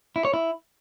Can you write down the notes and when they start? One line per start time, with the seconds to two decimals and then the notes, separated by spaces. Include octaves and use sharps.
0.16 E4
0.25 C#5
0.34 E4